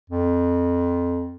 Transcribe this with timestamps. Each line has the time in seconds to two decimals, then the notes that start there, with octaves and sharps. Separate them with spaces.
0.10 F2